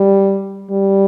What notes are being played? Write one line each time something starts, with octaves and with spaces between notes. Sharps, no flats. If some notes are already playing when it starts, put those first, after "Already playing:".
Already playing: G3
G3